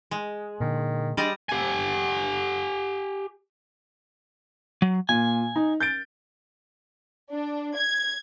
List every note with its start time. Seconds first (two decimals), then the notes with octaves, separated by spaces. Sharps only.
0.11 G#3
0.60 A#2 D3 D#3
1.17 G3 G#3 D4 D5 D#5
1.49 G4 G#5
4.82 F#3
5.09 A#2 G#5
5.56 D#4
5.80 G6 A6 D7
7.32 D4
7.76 G#6